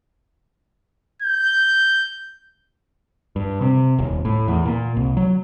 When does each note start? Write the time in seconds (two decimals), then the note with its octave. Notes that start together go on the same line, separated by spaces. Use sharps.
1.22 G6
3.36 G2
3.61 C3
3.98 D#1
4.25 A2
4.48 E2
4.65 A#2
4.96 C2
5.17 F#3